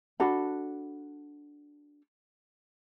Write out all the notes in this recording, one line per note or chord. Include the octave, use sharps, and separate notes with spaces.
D4 F#4 A4 B5